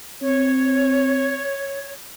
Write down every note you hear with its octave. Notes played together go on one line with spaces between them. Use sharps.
C4 C#5